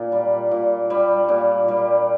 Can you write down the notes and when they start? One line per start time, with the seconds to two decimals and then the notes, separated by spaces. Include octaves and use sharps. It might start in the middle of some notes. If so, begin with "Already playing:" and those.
Already playing: A#2 D5
0.12 G3
0.51 A#2
0.90 G3
1.29 A#2
1.68 G3